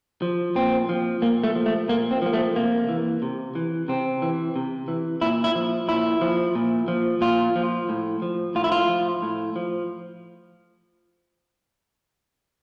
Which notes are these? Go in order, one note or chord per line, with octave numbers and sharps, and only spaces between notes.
F3
A#2 C4
F3
A#2 A#3
A3
F3
A3
A#2 A#3
C4
F3 A#3
A3
C3 A#3
E3
C3
E3
C3 C4
E3
C3
E3
A#2 E4
E4
F3
A#2 E4
F3
A#2
F3
A#2 F4
F3
A2
F3
A2 F4
E4
F4
F3
A2
F3